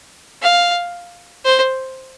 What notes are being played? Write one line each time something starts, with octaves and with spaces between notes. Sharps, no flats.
F5
C5